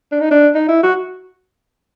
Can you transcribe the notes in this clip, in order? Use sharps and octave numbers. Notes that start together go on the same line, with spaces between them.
D4
D#4
D4
D#4
E4
F#4